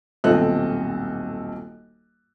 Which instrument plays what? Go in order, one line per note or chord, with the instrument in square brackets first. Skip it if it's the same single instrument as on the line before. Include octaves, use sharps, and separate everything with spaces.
[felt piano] D#1 B1 C4 A4 D#5 F#6